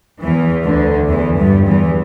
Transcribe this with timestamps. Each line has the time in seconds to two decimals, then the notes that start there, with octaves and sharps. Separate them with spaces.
0.22 E2 E3
0.65 D2 D3
1.09 E2 E3
1.38 G2 G3
1.67 E2 E3